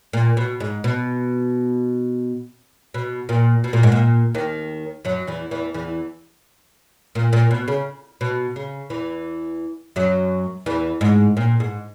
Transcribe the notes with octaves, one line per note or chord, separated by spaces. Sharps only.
A#2
B2
G#2
B2
B2
A#2
B2
A#2
G#2
A#2
D#2 D#3
F#2 F#3
E2 E3
E2 E3
E2 E3
A#2
A#2
B2
C#3
B2
C#3
E2 E3
F#2 F#3
E2 E3
G#2
A#2
G#2